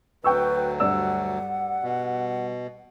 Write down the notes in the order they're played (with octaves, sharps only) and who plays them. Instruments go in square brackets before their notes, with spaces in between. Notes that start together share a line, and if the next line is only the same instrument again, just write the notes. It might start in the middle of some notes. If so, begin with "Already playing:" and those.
[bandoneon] D2 F#3 [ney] B4 [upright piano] G5 C#6 E6
[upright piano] G2 D5 E6 [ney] F#5
[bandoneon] B2